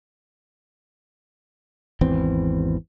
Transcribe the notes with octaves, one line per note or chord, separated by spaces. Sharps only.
G#1 E2 E3 C4